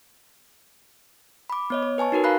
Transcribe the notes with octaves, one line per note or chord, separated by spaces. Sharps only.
B5 D6
B3 C#5 D#5
C#5
B4 G#5 A5 C#6
D#4 F#4 A#4 B4
F5 A#5 B5 F#6 C7